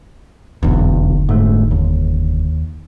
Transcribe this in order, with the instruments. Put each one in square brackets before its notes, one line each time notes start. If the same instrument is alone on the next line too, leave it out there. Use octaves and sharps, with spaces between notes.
[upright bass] F1 D3 [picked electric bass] B1 E2
[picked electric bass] G#2 A3
D#2